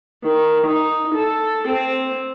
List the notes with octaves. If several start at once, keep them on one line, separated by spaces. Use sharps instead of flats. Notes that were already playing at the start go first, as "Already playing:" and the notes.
D#3
D#4
A4
C4